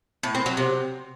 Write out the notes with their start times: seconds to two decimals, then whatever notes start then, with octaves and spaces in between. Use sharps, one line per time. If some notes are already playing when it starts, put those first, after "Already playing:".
0.23 A2
0.35 C4
0.46 F#3
0.57 C3